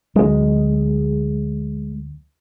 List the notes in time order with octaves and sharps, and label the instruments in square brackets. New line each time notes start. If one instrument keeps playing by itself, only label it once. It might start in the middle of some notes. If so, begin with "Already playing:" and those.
[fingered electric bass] D2 F#3 [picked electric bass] G#3